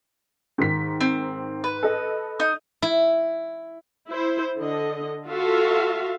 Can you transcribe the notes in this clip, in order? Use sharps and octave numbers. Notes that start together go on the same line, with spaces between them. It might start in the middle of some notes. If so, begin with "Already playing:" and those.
G#2 D#3 B6
C4
B4
A4 D#5
D#4 D#6
E4
E4 C5
D3 D#5
F4 F#4 A4 E5 F5